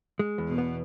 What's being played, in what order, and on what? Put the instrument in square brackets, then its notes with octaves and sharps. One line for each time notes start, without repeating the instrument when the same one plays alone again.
[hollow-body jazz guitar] G#3
E2
[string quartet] B2
[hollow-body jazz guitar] B3